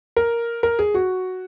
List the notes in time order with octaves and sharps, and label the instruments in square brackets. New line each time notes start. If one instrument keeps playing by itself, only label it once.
[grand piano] A#4
A#4
G#4
F#4